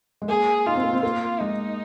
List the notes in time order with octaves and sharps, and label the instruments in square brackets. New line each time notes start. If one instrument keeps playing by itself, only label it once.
[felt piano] G#3
[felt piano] A#3 [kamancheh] G#4
[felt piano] D#4 [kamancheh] F4
[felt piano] C4
A#3
C4
[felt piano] A#3 [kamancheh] F4
[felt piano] G#3 [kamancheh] D#4